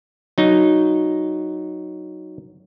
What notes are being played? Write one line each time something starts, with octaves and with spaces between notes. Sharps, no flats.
F#3 D#4